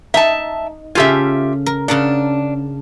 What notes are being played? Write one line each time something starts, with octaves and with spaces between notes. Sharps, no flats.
D#4 E5 A5
C#3 F4 G4 A4 E5 G#5
A#4
C#3 D4 A#4 F#5